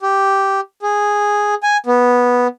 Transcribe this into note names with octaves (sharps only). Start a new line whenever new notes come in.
G4
G#4
G#5
B3